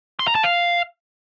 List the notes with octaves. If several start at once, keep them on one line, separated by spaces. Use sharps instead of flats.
C6
A#5
A5
F5